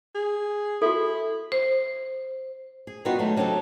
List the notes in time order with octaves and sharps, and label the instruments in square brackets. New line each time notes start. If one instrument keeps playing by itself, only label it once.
[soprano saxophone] G#4
[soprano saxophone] E4 [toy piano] F#4 A4
[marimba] C5
[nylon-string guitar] G#4
C#3 G3 B3 D#4 F4 F#4
D#3 F#3 A3
C3 F#3 D4 D#4 G#4 A4